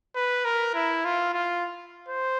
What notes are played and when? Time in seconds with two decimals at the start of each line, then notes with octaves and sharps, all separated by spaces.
0.16 B4
0.45 A#4
0.75 E4
1.05 F4
1.34 F4
2.09 C5